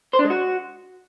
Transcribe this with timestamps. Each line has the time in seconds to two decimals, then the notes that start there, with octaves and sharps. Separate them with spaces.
0.13 C5
0.19 D4
0.25 G#3
0.30 F#4